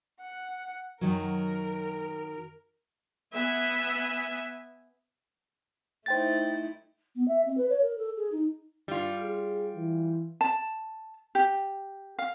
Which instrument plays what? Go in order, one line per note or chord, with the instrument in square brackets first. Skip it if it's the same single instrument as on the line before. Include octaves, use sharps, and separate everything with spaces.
[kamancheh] F#5
[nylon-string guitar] F#2 D#3 F#3 [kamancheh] A#4
[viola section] B3 E5 G#5
[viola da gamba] A3 D#4 E4 [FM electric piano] C5 G5 A6
[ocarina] B3
E5
C4
B4
C#5
A#4
A4
G#4
D#4
[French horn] G2 [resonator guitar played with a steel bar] G3 F4
[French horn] G#4
E3
[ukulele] A5
G4
F5